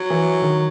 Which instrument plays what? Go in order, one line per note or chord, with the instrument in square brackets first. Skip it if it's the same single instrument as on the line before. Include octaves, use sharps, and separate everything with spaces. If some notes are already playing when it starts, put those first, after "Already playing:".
Already playing: [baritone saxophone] F#3
[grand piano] E3
D#3